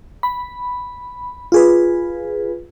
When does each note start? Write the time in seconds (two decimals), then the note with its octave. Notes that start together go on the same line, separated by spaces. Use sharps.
0.23 B5
1.52 F4 G#4 B4